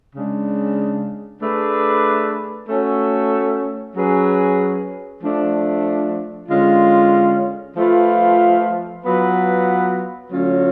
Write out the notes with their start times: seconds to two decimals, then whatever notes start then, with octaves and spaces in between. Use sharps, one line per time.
0.14 C#3 G#3 D4
1.40 A3 D4 G#4 B4
2.67 A3 C#4 F#4 A4
3.94 F#3 C#4 G#4 B4
5.21 F3 A3 D4
6.48 D3 G#3 C#4 F4
7.76 F3 A3 F4 B4
9.03 F#3 B3 F4 B4
10.30 D3 F#3 A3 C#4 F4